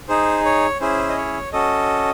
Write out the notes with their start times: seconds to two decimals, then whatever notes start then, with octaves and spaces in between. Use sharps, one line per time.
0.08 D#4 G#4 C5
0.45 C#5
0.80 C#4 E4 G#4 C5
1.09 D#5
1.16 C#5
1.53 C#4 F#4 A4 D#5